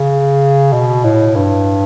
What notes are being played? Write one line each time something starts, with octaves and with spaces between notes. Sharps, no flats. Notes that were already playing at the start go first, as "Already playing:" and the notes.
Already playing: C#3
B2
A2
G2